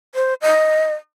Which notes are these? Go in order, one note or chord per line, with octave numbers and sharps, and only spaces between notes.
C5
D#5